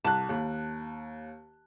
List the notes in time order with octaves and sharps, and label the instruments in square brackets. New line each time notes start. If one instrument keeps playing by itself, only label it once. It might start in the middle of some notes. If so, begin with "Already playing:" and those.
[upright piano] C2 F#6 [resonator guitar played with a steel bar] A5
[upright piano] D#2